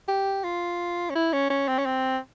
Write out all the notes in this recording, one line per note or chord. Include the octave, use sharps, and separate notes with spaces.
G4
F4
C#4
E4
C#4
C#4
C4
C#4
C4